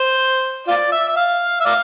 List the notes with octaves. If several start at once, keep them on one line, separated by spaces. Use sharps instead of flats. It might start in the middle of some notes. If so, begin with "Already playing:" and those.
Already playing: C5
F4 D5
E5
E5
F5
E5
D5 F5